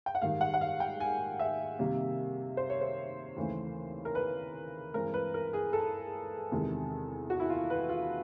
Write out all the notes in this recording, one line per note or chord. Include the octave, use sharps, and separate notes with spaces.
G5
F#5
G#2 D#3 G3 F5
F#5
F#5
F5
G5
G#5
E5
C3 D#3 G3 A#3
C5
C#5
C5
D#2 C#3 E3 A3
A#4
B4
G2 E3 G#3 C4 A#4
B4
A#4
G#4
A4
E2 C3 D#3 G#3
F#4
E4
F4
B4
F4